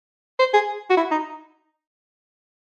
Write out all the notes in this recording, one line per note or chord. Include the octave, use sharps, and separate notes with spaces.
C5
G#4
F#4
E4
D#4